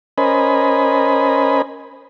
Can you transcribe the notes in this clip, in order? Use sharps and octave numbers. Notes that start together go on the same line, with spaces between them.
C#4 A#4 C5 D#5 G#5 B5